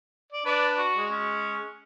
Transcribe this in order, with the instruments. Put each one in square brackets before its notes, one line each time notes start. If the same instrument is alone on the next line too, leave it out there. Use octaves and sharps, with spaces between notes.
[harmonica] D5
[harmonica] D4 B4 [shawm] D5
[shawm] F#4
[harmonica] G#3
[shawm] C#4